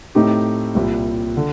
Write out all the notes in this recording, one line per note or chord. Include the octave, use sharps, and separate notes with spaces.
A2 A3 C4 D#4 G4
C2 A#2 G3
D3